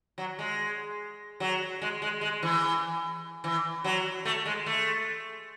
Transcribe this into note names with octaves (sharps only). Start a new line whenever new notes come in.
F#3
G#3
F#3
G#3
G#3
G#3
E3
E3
F#3
A3
G#3
A3